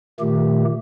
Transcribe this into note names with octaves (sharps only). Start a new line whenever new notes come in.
A#2 D#3 A3 G4